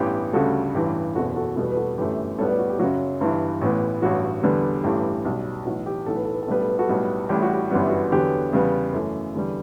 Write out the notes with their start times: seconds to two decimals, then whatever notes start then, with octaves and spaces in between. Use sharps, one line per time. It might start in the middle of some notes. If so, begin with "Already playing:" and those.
Already playing: A1 G2 E3 B3 G4
0.33 D2 C#3 G3 F#4 A4
0.74 A1 G2 E3 G4
1.15 F#1 E2 B2 F#4 A4
1.36 F#4 A4
1.56 E2 B2 G3 B3 F#4 A4
1.71 B4
1.76 F#4 A4
1.97 G1 F#2 E3 A3 G4 B4
2.38 B1 A2 G3 B3 A4 C#5
2.48 B4 D5
2.59 F#4
2.69 G4
2.79 F#2 C#3 F#3 F#4
3.20 G1 G2 E3
3.61 A1 A2 E3 B3
4.02 A1 G2 F#3 F#4
4.42 E2 D3 G3 B3
4.84 A1 G2 E3 A3 G4
5.25 B1 B2 G3
5.65 B1 A2 E3 F#4
5.86 G4
6.06 B1 A2 E3 A4
6.16 B4
6.25 A4
6.34 B4
6.43 A4
6.47 B1 A2 G3 B3 B4
6.60 A4
6.69 B4
6.79 F#4 A4
6.89 B1 A2 G3 B3 F#4
7.29 A1 A2 G3 G4
7.42 F#4
7.54 G4
7.70 G1 F#2 E3 G3 B3 F#4
7.90 F#4
8.11 E2 D3 F#3 B3 G4
8.53 E2 C#3 G3 B3
8.93 F#2 E3 A3
9.35 E2 D3 G3